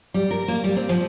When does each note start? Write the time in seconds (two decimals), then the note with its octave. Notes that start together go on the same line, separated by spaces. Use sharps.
0.14 G3
0.31 A#4
0.48 A#3
0.64 G3
0.77 C4
0.89 F3